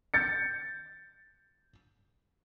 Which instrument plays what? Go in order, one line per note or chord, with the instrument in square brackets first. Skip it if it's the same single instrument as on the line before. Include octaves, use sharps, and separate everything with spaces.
[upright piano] G6 A6 C#7